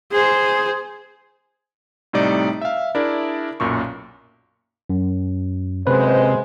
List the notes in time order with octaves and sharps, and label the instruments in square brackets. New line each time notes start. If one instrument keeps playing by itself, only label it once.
[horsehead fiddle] G#4 C5
[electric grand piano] A2 C3 G3 D#4 D5
E5 F5
D4 E4 G#4 A#4 D5
B1 F#2 A#2 C#6
[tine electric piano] F#2
[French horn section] F#2 G#3 C5 [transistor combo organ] C3 [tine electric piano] B4